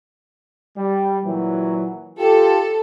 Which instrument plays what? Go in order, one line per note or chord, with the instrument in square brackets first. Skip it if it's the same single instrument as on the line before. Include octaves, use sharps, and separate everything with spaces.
[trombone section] G3
A#2 E3 F#3
[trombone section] F4 G4 [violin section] A4